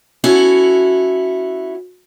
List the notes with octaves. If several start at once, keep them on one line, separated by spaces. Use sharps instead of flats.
C#4 E4 F#4 A4